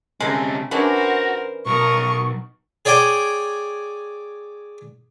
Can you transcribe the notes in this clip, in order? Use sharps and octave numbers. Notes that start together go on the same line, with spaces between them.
C3 G#3 A3 C#4 D#4
E3 C#4 D4 F#4 A#4 C5
B1 A#4 C#6 D#6
G#4 C#5 D5 G5 G#5